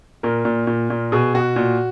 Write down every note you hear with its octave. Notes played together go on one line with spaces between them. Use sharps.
A#2 A#4
A#2
A#2
A#2
B2 G#4
B2 F#4
A#2